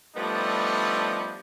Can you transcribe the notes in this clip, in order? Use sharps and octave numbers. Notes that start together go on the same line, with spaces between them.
F3 G3 A3 B3 D4 D#4